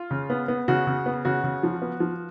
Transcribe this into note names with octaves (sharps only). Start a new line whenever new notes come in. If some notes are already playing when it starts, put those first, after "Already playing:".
Already playing: F4
C#3
B3
B3
C#3 F#4
C#3
B3
C#3 F#4
C#3
F3
B3
F3